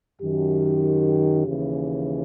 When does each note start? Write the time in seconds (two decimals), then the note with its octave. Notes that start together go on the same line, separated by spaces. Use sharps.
0.21 F#2 D#3 G4
1.46 D#2 C#3 E3